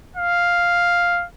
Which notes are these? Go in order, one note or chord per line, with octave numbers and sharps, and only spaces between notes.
F5